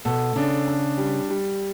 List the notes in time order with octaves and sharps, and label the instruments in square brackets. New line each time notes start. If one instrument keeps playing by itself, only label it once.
[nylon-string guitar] B2 [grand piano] A4
[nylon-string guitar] C#3 [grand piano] D4
[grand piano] D4
G3
G3